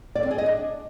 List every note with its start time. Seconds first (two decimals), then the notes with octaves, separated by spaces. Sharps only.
0.15 D5
0.23 C4
0.31 G#4
0.38 D#5
0.46 D4